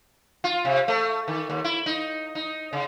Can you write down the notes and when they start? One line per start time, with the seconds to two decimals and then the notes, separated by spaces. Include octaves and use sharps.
0.44 F4
0.65 C3
0.88 A3
1.28 D#3
1.50 D#2
1.64 E4
1.86 D#4
2.35 D#4
2.73 C#3